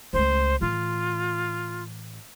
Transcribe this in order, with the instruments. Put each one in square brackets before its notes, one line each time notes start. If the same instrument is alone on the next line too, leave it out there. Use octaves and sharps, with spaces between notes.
[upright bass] C#2 A3 [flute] C5
[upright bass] A2 E3 [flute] F4